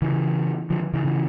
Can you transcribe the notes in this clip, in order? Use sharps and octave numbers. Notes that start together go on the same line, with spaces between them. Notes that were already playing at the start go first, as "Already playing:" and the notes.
C#3 E3
D3 F3
C#3 E3
C#3 E3